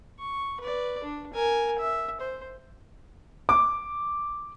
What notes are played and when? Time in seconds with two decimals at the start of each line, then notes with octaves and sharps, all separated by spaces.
0.19 C#6
0.60 B4 D5
1.04 D4
1.33 A#4 G#5
1.78 E5
2.20 C5
3.49 D6